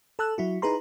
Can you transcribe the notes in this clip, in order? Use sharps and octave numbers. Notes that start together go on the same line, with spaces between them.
A4 A5 E6 F#6
F#3 E4 F#4
D#4 E4 G#4 B4 A#5 C6